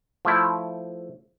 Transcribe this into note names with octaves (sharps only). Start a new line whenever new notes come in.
F3 A3 E4